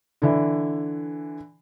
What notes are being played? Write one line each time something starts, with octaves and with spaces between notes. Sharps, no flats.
D3 E3